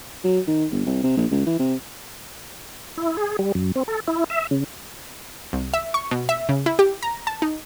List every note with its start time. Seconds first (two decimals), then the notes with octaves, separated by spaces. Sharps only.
0.24 F#3
0.48 D#3
0.71 G1
0.86 C2
1.03 C3
1.17 A#1
1.31 C#2
1.46 E3
1.59 C3
2.97 E4
3.17 G#4
3.39 G3
3.55 F#2
3.76 C4
3.88 A4
4.08 E4
4.30 E5
4.51 C#3
5.53 C2
5.74 E5
5.94 C#6
6.11 B2
6.29 E5
6.49 C#3
6.66 E4
6.79 G4
7.03 A#5
7.27 A5
7.42 D#4